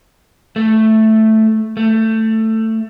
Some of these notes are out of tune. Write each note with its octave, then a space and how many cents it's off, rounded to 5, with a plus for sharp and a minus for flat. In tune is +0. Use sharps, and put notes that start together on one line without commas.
A3 +0
A3 +15